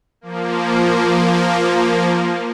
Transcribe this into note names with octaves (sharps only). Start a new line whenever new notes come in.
F3 A#3